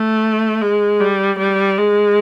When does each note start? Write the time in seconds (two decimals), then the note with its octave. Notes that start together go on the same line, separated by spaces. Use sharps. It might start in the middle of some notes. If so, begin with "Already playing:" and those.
Already playing: A3
0.61 G#3
1.00 G3
1.39 G3
1.78 G#3